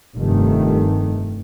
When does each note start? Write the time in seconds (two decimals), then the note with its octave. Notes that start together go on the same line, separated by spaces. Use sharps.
0.15 F1 G2 D#3 A3